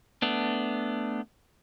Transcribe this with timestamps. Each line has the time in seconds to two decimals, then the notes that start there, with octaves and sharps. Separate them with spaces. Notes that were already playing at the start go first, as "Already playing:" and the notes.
0.22 A3 B3 D4